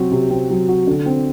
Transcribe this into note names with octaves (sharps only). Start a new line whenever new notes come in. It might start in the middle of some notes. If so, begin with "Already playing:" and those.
Already playing: C3 F#3 C4 F#4
C3
C4
F#3
F#4
D3
C4